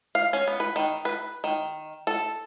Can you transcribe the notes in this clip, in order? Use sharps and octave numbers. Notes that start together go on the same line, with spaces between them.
F5
C#4
B3
B4
D#3
B4
D#3
A4